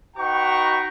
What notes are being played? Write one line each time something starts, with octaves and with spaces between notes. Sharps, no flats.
D#4 F#4 B4 G5 A#5 C#6